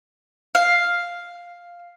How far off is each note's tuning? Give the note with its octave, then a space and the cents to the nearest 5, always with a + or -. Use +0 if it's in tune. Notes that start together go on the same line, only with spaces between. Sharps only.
F5 +5